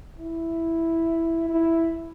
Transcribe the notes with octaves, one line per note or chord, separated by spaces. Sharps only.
E4
E4